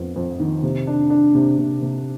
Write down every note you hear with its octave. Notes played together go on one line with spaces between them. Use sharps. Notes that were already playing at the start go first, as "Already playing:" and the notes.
Already playing: F2 B3
F2
D#3
C3
D4
D4
C3
C3
C3